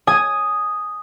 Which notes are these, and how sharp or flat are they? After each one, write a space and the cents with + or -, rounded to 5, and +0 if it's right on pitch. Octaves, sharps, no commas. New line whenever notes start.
G#5 +0 D#6 +0